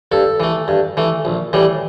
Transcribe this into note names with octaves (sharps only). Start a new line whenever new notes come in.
G2 A4
E3 A3
G2
E3 A3
A#1
A2 E3 G3